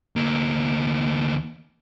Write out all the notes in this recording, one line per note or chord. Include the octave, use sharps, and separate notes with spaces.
D2 A#3